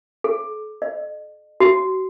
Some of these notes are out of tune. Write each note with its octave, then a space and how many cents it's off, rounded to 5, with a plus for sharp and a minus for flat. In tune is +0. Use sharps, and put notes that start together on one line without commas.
A4 -45
D#5 -40
F#4 +30